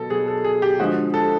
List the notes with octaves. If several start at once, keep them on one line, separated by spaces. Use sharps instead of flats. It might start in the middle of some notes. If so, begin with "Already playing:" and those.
Already playing: B2 F#3 A4
B2 F#3 G#4
A4
G#4
G4
D3 F3 G#3 F#4
A4